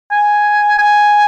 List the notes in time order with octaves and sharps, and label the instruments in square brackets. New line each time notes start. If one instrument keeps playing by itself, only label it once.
[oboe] G#5
G#5